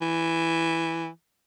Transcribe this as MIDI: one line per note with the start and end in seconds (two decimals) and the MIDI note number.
0.01 1.08 52